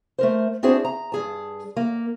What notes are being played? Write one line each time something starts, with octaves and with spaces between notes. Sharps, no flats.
A3 A#4 C5
C4 D4 E4 F#4 G#4 C5
A#5
G2 G#4 A5
A#3